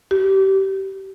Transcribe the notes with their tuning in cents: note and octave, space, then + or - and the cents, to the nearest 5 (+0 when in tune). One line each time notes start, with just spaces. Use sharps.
G4 -25